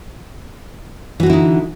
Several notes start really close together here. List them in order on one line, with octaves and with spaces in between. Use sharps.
E3 F#4 D3 E4 D#4